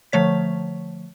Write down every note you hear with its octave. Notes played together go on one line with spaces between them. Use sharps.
D3 F3 A3 C#5 B6